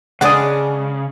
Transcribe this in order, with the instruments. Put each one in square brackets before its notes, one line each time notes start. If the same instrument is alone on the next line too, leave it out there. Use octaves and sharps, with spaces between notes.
[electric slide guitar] C#3 [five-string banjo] G#3 D4 [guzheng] G#4 D5 [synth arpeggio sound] F#5 D#6